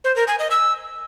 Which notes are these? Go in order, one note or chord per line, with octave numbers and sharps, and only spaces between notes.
C5
A#4
G#5
D#5
E6